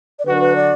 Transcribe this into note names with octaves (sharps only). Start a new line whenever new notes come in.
D5
D3 F#3 D4 F#4 B4
A#4
B4
D5